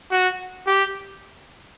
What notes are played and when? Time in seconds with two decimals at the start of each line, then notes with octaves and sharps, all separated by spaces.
0.11 F#4
0.67 G4